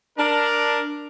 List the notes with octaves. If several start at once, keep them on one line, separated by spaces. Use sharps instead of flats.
D4 A#4